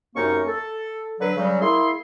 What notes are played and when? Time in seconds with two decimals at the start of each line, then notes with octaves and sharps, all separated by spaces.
0.15 F#2 C3 A#3 C#4 D#4 C#6
0.48 A4
1.20 D3 F#3 B4
1.37 C#3 F#3 G3
1.61 A#3 E4 G#4 C6